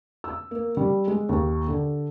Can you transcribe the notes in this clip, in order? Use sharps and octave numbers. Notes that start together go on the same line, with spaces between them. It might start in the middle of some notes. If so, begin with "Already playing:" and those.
E6
A#3
G3
G#3
D#2
D3